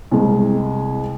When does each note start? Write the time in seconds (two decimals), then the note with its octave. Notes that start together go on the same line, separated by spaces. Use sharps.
0.11 C2 G#3